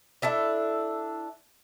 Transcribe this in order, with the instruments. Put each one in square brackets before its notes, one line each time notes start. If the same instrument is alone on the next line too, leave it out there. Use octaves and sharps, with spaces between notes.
[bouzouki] D4 E4 A4 E5